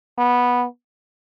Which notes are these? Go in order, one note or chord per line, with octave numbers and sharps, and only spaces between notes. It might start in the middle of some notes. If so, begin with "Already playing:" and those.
B3